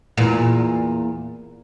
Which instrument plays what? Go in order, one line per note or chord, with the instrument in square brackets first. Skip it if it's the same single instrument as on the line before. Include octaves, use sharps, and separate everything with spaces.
[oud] E2 A#2